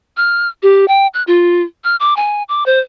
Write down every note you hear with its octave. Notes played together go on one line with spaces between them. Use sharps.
F6
G4
G5
F#6
F4
F6
D6
G#5
D6
C5